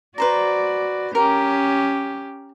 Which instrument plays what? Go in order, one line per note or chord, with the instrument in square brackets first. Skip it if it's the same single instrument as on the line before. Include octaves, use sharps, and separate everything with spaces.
[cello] F#4 D5 [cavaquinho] B4 C5 A#5
[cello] C#4 G4 [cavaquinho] A#4